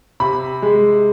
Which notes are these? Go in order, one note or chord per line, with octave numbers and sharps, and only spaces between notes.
C3 B5
G#3